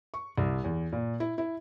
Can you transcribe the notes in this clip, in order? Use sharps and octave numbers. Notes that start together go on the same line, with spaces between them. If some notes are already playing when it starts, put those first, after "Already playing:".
C#6
C2
E2
A#2
E4
E4